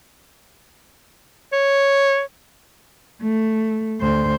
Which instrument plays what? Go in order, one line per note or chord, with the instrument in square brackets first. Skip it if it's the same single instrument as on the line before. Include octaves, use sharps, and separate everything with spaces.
[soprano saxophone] C#5
[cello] A3
D2 C5